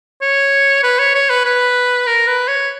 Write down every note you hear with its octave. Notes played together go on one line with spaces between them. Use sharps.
C#5
B4
C#5
C#5
B4
B4
A#4
B4
C#5